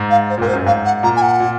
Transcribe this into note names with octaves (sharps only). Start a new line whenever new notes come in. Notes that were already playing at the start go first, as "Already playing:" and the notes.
Already playing: G#2
F5
C5
A#2
G#2 A#4
C5
F#2
G#2 F5
F#5
A#2 A#5
G#5
F#5
A#2